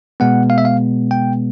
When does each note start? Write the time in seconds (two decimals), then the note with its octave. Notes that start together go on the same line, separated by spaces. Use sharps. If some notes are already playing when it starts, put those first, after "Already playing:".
0.20 B2 G#3 B3 F#5
0.50 F5
0.58 E5
0.65 F5
1.11 G5